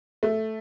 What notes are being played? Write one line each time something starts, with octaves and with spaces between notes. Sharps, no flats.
A3